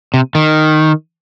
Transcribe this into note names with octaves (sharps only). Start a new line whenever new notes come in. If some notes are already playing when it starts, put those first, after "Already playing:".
C3
D#3